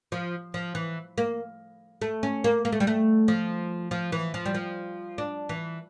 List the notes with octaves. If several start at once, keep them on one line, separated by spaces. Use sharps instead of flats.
F3
F3
E3
A#3
A3
C#4
A#3
A#3
A3
G3
A3
F3
F3
E3
F3
G3
F3
D4
E3